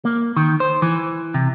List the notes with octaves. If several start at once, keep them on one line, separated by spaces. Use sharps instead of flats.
A#3
D#3
C5
E3
C3